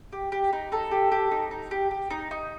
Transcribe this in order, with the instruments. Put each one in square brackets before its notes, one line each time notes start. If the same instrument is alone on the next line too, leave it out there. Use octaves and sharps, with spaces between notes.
[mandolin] G4
G4
D#4
D#4 A4
G4
G4
D#4
D#4
G4
G4
D#4
D#4